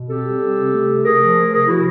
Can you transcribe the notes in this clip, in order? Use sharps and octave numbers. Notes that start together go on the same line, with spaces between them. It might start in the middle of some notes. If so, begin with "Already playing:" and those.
Already playing: B2
C4 G4 A4
G3
C4
C3
A3
C3
A3 G#4 A#4
F3
A3
C3 G#4 A#4
F3 E4 F#4